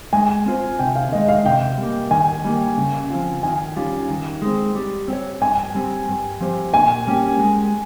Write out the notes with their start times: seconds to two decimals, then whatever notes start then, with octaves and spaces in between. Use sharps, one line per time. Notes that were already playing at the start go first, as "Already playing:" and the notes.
0.13 G#3 G#5
0.46 C4 F4 C5
0.79 C3 G5
0.95 F5
1.11 D#3 G#3 D#5
1.29 F5
1.45 C3 G5
1.78 G3
1.83 A#3
2.11 D#3 G#5
2.44 G3 A#3
2.77 C#3
3.10 F3 C4 F4
3.43 D#3 G#5
3.76 G3 C#4 F4
4.10 D#3
4.42 G#3 C4
4.75 G3
5.08 C4 G4
5.13 C#5
5.41 G2 G#5
5.75 G3 C4
6.08 G2
6.41 F3 C4 G4 C5
6.73 A#2 G#5
7.07 G3 A#3 C#4 G4
7.39 G#3